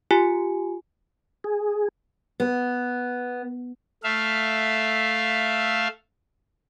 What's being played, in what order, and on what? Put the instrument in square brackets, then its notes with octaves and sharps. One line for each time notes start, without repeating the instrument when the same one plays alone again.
[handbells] F4 G4 G#5
[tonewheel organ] G#4
[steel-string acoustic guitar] B3
[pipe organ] A3 E5 F5